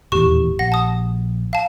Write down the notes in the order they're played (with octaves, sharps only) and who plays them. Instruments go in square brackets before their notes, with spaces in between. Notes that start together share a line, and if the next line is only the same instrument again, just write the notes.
[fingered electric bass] D#1 E2 A2 [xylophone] G4 C#6
[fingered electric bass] A#1 [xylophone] F#5 A#6
[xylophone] A5 D#6
F5 A5